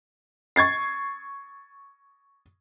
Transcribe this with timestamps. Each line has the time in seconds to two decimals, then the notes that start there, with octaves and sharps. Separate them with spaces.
0.56 C#6 G#6 A6 C7